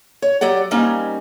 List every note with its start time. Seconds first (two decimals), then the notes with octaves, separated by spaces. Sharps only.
0.22 C#5
0.41 F#3 G4 D5 F#5
0.71 G3 A#3 C4 C#4 D#4